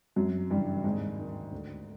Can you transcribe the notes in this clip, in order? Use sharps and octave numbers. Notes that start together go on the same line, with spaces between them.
F#2 F#3
G2 C#3 E3 G3
D#2 G#2 G#3
D#3
D2